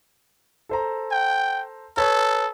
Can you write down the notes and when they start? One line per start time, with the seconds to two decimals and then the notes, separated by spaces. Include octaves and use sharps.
0.69 A4 C5 A#5
1.11 G5
1.97 A4 B4 C#5